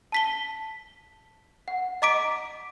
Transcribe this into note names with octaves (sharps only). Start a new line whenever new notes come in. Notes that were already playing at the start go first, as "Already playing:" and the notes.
A5 B6 G7
F#5
D#5 A#5 D6 B6 D7